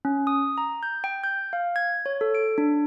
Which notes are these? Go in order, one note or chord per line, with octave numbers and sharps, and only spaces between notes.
C#4
D#6
A#5
G6
G5
G6
F5
G#6
C#5
A4
D7
D4